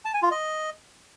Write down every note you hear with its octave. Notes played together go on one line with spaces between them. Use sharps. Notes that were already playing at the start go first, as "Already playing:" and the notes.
A5
G#5
F4
D#5